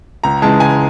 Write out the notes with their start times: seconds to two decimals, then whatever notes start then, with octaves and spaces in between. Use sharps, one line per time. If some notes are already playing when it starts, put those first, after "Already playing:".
0.24 C#2 A#5
0.42 C#3 E3 G#3 A5
0.60 C#2 G#5